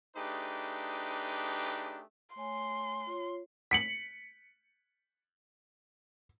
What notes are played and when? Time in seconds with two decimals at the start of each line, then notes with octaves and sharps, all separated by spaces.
0.16 A3 D4 D#4 G4 G#4 B4
2.36 A3 C#5 G#5 C6
3.07 F4 C#5
3.71 B6 C#7 F#7